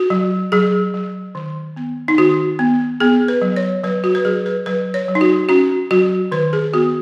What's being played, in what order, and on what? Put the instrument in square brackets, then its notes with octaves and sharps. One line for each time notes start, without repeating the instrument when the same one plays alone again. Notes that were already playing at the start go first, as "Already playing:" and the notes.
Already playing: [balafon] F#4
F#3
F#3 G#4
F#3
D#3
B3
D#4
D#3 F#4
B3
B3 G#4
B4
F#3
C#5
F#3 B4
F#4
B4
F#3 G#4
B4
F#3 B4
C#5
F#3
D#4
F#4
C#4 F#4
F#3 F#4
D#3 B4
G#4
B3 F#4